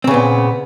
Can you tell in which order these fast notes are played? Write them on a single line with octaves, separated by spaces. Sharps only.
C4 C#3 B3 A#2